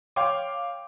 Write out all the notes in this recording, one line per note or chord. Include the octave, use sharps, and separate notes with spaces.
C#5 F5 G5 C6 D6